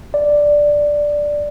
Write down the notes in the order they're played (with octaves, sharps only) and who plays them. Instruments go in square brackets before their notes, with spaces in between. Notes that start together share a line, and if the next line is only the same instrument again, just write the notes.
[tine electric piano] D5